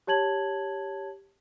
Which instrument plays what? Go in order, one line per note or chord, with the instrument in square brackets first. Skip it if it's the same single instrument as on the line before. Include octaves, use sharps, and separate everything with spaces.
[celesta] G4 C#5 A5 G#6 F#7